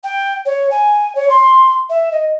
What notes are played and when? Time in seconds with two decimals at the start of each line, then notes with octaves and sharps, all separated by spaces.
0.03 G5
0.45 C#5
0.70 G#5
1.15 C#5
1.29 C6
1.89 E5
2.12 D#5